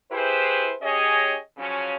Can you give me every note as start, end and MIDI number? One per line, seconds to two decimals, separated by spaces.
0.11 0.73 64
0.11 0.73 67
0.11 0.73 68
0.11 0.73 71
0.11 0.73 72
0.82 1.37 61
0.82 1.37 67
0.82 1.37 68
0.82 1.37 73
0.82 1.37 75
1.58 1.95 49
1.58 1.95 53
1.58 1.95 54
1.58 1.95 61